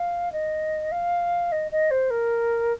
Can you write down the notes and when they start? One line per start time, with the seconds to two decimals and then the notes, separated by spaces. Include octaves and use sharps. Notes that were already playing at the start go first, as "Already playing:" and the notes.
Already playing: F5
0.32 D#5
0.92 F5
1.52 D#5
1.71 D#5
1.91 C5
2.10 A#4